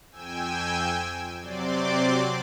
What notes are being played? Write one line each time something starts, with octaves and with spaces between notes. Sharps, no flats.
F2 G5 G#5 E6
C3 F#3 C4 D5 C6 D6